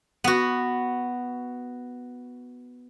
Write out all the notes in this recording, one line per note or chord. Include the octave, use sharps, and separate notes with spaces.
B3 F#4